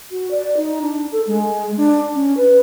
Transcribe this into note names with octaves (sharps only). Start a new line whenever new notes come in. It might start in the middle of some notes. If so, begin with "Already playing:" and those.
F#4
D5
D#4
D4
A4
G#3
D4
C#4
B4